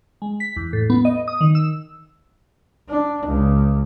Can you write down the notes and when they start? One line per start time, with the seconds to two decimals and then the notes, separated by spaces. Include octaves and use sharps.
0.22 G#3
0.40 B6
0.56 E2
0.73 A2
0.90 B3
1.05 D#5
1.28 D#6
1.41 D#3
1.55 E6
2.88 D4
3.26 C#2